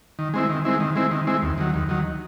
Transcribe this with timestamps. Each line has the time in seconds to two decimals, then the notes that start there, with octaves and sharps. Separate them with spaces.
0.19 D#3
0.34 G#3 C4 E4
0.49 D#3
0.65 G#3 C4 E4
0.80 D#3
0.96 G#3 C4 E4
1.11 D#3
1.27 G#3 C4 E4
1.42 D#2
1.58 D#3 F#3
1.74 D#2
1.89 D#3 F#3